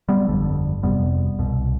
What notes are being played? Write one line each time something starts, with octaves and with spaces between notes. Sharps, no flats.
G3 B3
G1 F2 D3
F1 F2 C3 G3 B3
C2 B2